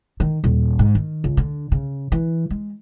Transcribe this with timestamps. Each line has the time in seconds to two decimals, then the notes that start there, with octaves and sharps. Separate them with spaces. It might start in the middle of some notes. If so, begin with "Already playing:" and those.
0.20 D#3
0.44 D#1
0.79 G#2
0.95 D#3
1.24 C#2
1.37 D3
1.72 C#3
2.12 E3
2.50 G#3